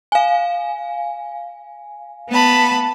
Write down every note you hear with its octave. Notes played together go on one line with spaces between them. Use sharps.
F5 G#5
B3 A5 B5